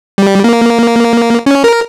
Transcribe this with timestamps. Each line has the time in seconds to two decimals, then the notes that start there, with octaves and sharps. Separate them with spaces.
0.18 G3
0.44 A#3
1.46 C#4
1.64 A#4